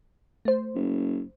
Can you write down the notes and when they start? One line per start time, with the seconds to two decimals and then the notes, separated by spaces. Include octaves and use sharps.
0.45 A3 C5
0.75 F#1